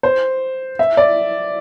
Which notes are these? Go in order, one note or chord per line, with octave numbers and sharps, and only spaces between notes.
C5
E5
D5